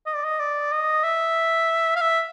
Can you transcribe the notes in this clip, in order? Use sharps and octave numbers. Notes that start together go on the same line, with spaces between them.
D#5
D5
D#5
D5
D#5
E5
F5
E5